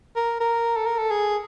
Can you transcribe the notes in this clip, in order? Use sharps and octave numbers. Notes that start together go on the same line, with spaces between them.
A#4
A#4
A4
A#4
A4
G#4